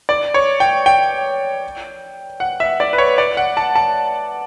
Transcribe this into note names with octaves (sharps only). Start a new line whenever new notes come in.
D5
C#5
G5
G5
F#5
E5
D5
B4
C#5
D5
F#5
A5
A5